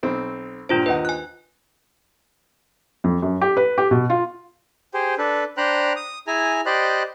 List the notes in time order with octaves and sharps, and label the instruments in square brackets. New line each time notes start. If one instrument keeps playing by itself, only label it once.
[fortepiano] B1 C4
[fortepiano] G2 A#2 [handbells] D4 F4 C5
[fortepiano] D#2 D#4 F#5 [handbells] B4
[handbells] G#5 F#6
[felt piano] F2
F#2
G4
B4
G4
B2
F4
[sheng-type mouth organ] G4 G#4 C5
D4 A4 B4
D4 C5 G5 A#5 B5 F#6
D#6
E4 G#4 G#5 A#5
G4 C5 D5 D#5 B5 F#6